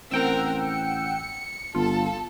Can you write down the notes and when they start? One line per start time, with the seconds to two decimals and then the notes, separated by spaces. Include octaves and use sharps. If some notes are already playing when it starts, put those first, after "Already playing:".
0.11 A1 C4 A#4 F#5 G5 E6
0.63 C#7
1.75 G1 F4 A4 A5